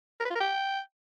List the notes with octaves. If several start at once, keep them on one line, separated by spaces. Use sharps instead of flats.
A#4
B4
F4
A#4
G5